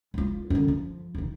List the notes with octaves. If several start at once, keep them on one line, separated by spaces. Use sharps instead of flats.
G#3 F4
F#2 D3
F3
E1 D#3